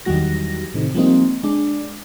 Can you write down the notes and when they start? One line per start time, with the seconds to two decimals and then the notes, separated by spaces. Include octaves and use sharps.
0.05 E2 D#3 F#3 G3 F#4 A#6
0.74 A2 C3 D#3
0.94 F3 G3 G#3 A#3 C4 D#4
1.43 G#3 D4